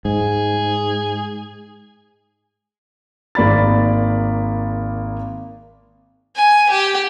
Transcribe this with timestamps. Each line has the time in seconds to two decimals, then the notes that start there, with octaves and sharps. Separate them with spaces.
0.05 G#2 G#4
3.35 G#1 A#3 D5 B5 A6
6.36 G#5
6.70 G4